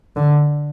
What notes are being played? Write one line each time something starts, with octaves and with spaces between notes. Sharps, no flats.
D3